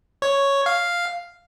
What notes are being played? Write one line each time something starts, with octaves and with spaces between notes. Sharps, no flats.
C#5
F5